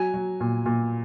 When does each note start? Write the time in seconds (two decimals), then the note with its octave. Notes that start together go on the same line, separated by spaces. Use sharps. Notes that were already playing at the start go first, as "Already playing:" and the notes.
Already playing: F#3 G#5
0.14 F#3
0.40 A#2
0.66 A#2